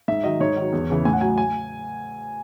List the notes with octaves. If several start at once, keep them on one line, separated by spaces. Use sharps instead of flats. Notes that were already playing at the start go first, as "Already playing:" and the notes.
G#2 E5
D#3 F#3 D#5
G#2 C#5
D#3 F#3
E2
C#3 E3
A2 G#5
F#5
F#3 G#5
G#5